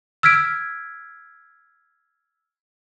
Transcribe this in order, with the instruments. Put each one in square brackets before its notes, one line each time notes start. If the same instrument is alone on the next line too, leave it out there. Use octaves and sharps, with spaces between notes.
[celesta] E6 F6 G#6 B6 D7